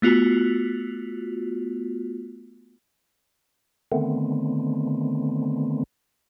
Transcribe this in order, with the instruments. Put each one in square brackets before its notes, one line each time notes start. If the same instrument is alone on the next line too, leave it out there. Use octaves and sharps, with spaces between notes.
[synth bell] A3 B3 F4 F#4
[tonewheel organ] D3 D#3 A3 B3 C4